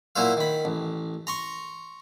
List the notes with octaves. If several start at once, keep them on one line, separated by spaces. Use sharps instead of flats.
A#2 F#3 E4 C5 F5
D#3 B5
A1
A#5 C6 C#6